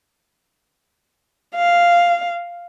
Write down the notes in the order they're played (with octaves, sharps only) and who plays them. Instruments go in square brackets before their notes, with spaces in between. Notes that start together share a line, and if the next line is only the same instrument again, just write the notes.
[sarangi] F5